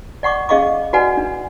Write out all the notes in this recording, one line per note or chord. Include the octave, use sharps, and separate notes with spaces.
D5 F#5 C#6 D6
C#4 G#4 D#5 F5 C#6 D6
F#4 B4 D5 F#5 G#5
D4